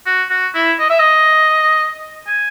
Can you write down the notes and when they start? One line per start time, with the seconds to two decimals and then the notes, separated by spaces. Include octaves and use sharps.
0.06 F#4
0.30 F#4
0.54 E4
0.80 D#5
0.90 E5
1.00 D#5
2.27 G#5